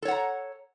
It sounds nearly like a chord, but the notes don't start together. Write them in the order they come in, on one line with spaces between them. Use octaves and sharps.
A4 C#5 F#5 A#5